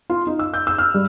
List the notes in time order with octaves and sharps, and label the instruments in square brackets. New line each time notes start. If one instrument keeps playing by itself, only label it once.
[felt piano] F4
D#4
E6
G6
E6
F6
G2